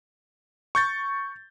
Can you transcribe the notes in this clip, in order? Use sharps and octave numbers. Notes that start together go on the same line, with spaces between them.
C#6 G6 A6